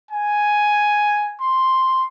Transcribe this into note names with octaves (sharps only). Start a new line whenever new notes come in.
G#5
C6